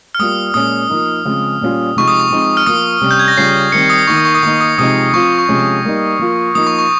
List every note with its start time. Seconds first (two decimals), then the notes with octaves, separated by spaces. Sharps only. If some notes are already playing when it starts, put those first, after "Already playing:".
0.15 F6
0.19 G3 A#3 F4 D#6
0.54 A#2 G#3 C#4 D#6
0.90 F3 A#3 D#4
1.25 C#3 F3 G#3 C4
1.61 A#2 G3 C#4 F4
1.96 C3 F3 G#3 D#4 C#6
2.08 D#6
2.20 C#6
2.31 F3 G#3 C4 D#4
2.57 F6
2.67 F3 A#3 F4 D#6
3.01 C3 G3 C#4
3.11 G6
3.19 G#6
3.28 A#6
3.37 C#3 G3 C#4 F4 C7
3.72 D#3 G3 C4 C#7
3.90 D#6
4.07 D#3 A#3 D#4 C#6
4.16 D#6
4.25 C#6
4.35 D#6
4.43 D#3 A#3 D#4 C#6
4.61 D#6
4.78 C3 F3 G#3 C4 D#4 D#6
5.13 F3 C4 F4 C#6
5.39 C#6
5.49 C3 F3 G#3 C#4
5.85 G3 A#3 D#4
6.19 F3 A#3 F4
6.55 F3 A#3 D#4 D#6
6.67 C#6
6.79 C#6